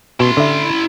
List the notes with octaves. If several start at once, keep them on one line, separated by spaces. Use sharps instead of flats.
B2 E4 C6
D3 E5